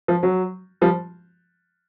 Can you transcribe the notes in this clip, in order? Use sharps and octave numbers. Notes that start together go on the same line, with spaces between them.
F3
F#3
F3 G3